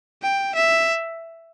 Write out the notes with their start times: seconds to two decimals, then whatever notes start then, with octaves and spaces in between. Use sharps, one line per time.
0.22 G5
0.55 E5